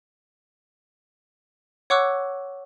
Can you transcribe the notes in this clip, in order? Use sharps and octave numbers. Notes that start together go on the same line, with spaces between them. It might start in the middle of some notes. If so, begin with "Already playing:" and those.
C#5 F#5 C#6 D6 E6 F#6